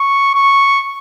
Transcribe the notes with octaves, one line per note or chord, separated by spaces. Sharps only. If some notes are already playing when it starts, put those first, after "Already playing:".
Already playing: C#6
C#6